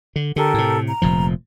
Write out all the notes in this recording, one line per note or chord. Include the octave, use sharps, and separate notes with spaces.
D3
D3 G4 A4 A#4
A2 C3
A#5
F1 A#2 F3